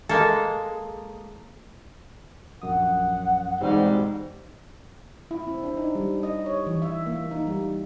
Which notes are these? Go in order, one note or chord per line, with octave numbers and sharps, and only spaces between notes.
G#3 A#3 A4
A#1 F#2 F#5 D#6
E2 G#2 B2 G3 C4
E4
C4
D4
D#4
G3
D#5
C#5
E3
E5
A#3
D#4
G3